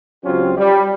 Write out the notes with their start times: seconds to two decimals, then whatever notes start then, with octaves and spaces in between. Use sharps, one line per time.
0.24 C#2 F#3 C4 C#4 F4 G4
0.57 G3